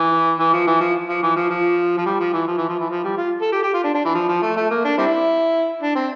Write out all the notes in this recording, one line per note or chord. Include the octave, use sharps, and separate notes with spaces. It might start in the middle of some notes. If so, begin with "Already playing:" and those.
Already playing: E3
E3
F3
E3
F3
F3
E3
F3
F3
F3
G3
F3
E3
F3
E3
F3
E3
F3
G3
F4
A4
G4
G4
F4
D4
D4
E3
F3
F3
A3
A3
A#3
D4
G3 C4 E4
D4
C4